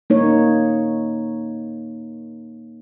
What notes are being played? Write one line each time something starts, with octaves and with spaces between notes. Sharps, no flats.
A#3 D#4 C#5